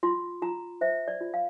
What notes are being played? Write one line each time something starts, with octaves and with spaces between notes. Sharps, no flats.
F4 C6
F4 A#5
C5 E5
D5
F4
F5